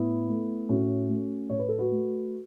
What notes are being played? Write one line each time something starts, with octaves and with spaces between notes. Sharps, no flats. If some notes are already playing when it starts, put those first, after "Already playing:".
Already playing: A2 B3 E4
A3
A2 C#4 F#4
A3
A2 C#5
B4
A4
F#4 B4
A3